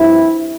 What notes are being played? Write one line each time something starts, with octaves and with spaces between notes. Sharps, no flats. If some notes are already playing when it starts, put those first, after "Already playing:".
Already playing: G2 F3 C4 E4